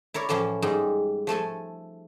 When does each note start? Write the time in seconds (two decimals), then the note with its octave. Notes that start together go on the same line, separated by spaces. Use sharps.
0.14 E4 A#4 C#5 D5
0.29 A2 E3 F3 C#4 E4
0.62 G#2 G3 G#3 D#4
1.27 F3 A3 A4 G#5